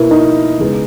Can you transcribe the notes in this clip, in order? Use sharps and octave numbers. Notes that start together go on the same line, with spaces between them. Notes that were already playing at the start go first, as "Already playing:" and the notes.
Already playing: B2 A#3 E4 A#4 B4
D#4
C#3 G#3 B3